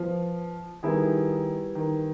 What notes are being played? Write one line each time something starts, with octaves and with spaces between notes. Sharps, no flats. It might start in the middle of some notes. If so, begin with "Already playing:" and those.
Already playing: F3 B3
D#3 G3 B3 E4 G#4
D#3